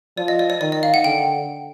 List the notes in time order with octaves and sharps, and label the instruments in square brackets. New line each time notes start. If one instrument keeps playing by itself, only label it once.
[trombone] F3 [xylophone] D5
[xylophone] D#5
D5
D5
[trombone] D#3 [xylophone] D5
[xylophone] D#5
F5
F#5
[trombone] D3 [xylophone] G5